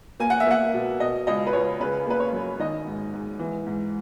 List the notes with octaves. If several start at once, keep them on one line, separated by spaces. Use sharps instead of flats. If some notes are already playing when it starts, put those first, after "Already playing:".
A#3 G#5
F#5
E5
A#3 F#5
B2
B2 D#5
C#2 D#5
B4
C#2 C#5
C#3 B4
A#3 B4
C#5
F#2
D#3 D#5
G#2
G#2
E3
G#2